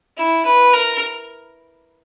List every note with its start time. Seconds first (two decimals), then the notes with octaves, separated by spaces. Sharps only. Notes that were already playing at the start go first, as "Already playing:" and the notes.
0.17 E4
0.45 B4
0.73 A#4